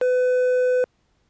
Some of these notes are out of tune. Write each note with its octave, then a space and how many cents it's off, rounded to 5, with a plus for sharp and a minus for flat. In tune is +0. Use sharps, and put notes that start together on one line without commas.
B4 +30